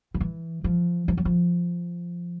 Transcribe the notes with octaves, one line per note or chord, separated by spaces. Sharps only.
F3
E3
F3
F3
F#3
F3